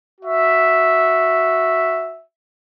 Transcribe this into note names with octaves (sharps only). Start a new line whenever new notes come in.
F#4 E5